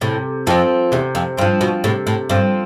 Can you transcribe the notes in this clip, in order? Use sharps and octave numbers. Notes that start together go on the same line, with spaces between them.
A2 C3
F2 F3 C4
E2 C3
F2
G2 F3 C4
B2
A2 C3
A2
G2 F3 C4